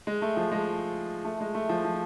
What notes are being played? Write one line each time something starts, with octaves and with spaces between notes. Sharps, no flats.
G#3
A3
F3
G#3
A3
G#3
A3
F3
F3